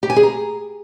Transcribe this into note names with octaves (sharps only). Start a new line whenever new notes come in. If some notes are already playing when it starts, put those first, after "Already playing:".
G4
G#5
G#4
A#5